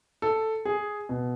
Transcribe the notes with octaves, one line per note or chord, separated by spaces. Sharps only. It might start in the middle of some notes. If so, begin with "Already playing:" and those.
A4
G#4
B2